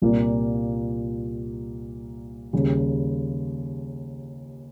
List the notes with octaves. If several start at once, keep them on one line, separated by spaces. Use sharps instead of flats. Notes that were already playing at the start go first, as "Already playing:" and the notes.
C2 A#2 G3 A#3 F4
D#2 C#3 G3